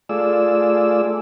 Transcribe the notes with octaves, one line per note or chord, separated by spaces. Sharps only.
A3 F4 G#4 D5 E6